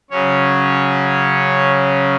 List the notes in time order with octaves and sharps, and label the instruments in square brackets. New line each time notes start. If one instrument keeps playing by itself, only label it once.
[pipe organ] C#3 F#3 C#4 C#5